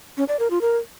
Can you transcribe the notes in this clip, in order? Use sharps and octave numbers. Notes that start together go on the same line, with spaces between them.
C#4
D5
A#4
F4
A#4